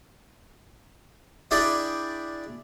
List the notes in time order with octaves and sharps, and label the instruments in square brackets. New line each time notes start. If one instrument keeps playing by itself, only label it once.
[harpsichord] D4 E4 G#4 D5 G5 B5